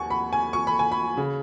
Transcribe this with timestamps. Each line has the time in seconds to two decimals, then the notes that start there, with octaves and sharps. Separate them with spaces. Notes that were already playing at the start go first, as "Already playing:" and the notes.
Already playing: D#2 F#5 G#5 C#6
0.10 B5
0.33 G#5
0.53 C#6
0.67 B5
0.79 G#5
0.92 B5
1.17 C#3